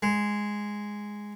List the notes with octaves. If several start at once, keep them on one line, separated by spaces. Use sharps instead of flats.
G#3